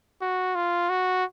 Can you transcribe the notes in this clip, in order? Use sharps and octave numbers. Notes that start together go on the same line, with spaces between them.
F#4
F4
F#4